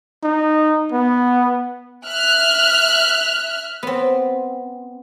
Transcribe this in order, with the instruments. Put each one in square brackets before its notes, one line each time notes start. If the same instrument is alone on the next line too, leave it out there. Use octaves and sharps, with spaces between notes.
[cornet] D#4
B3
[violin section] E5 F6 F#6
[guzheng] B3 C4